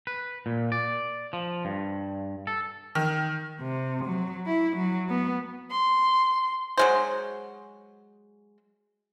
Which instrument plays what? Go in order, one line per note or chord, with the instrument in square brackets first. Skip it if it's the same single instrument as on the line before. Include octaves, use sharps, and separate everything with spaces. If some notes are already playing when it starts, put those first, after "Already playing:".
[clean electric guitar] B4
A#2
D5
F3
G2
A4
[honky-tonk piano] D#3
[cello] C3
F#3
E4
F#3
B3
[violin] C6
[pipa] F#3 G#3 C5